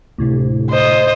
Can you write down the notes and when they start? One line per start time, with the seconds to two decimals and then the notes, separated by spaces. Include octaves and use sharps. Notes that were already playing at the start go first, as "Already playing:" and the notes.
0.18 D2 A2 C3
0.70 C5 D#5